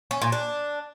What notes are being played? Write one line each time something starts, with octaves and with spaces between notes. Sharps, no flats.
C#4
A#2
D4